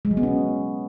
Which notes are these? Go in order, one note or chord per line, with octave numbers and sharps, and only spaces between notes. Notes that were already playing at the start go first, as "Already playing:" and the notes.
G#3
F#3
B3
C#4